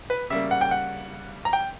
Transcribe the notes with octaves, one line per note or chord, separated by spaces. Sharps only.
B4
C#3 G3 A#3 E5
F#5
G5
F#5
A#5
G5